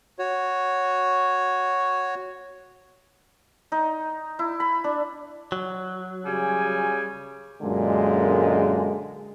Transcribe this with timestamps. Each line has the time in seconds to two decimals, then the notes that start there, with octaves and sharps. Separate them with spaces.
0.19 F#4 C#5
3.72 D#4
4.39 E4
4.60 B5
4.84 D4
5.52 F#3
6.25 C#3 G3 G#5
7.63 F#2 A#2 D3 G#3